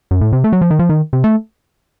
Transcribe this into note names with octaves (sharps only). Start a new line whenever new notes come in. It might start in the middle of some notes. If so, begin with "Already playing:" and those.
F#2
A2
C3
A3
F#3
F3
D#3
F3
D#3
C3
A3